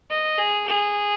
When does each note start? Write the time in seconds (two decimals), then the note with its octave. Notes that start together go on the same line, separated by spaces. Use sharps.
0.10 D#5
0.38 G#4
0.67 G#4